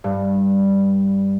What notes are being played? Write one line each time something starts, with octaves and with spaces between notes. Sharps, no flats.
G2